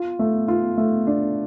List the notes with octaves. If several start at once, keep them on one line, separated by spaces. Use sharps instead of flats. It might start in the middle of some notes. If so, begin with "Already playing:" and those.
Already playing: F4
A3
F4
A3
D4